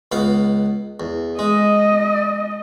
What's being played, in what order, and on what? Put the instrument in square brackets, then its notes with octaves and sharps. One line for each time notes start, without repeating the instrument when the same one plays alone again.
[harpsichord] C#2 B3 F5
E2
[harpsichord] G#3 [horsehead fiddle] D#5